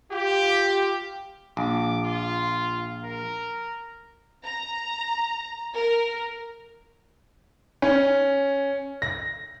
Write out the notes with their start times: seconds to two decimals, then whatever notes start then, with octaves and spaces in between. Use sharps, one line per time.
0.12 F4 G4
1.57 A#1 D6
2.04 F4
3.03 A#4
4.44 A#5
5.75 A#4
7.82 C#4
9.02 A#6